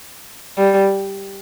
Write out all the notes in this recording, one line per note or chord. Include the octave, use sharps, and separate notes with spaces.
G3